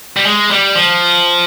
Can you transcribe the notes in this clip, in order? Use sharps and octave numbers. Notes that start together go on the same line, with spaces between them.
G3
G#3
G3
F3